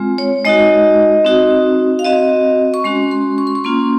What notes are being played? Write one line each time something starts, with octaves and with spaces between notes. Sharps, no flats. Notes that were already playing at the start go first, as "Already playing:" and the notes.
Already playing: G#3 C4 F4
C#5
G#3 D#4 F#4 D#5
C4 D#4 F#4
F5
C4 F#4 D#5
C#6
G#3 C#4 F#4 C6
C6
C#6
C6
C#6
A#3 C#4 F4 C6